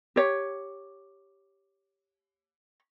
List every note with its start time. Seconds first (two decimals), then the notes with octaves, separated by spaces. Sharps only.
0.16 G4 C#5